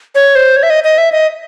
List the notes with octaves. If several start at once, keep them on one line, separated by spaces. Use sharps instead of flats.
C#5
C5
C#5
E5
D#5
D#5
E5
D#5